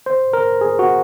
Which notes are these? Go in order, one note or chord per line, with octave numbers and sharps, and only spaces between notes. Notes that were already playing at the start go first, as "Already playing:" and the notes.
C5
A#4
G#4
F#4